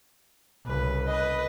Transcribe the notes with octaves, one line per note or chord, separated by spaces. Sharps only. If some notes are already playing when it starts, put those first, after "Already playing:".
C2 C#3 B4
B4 D#5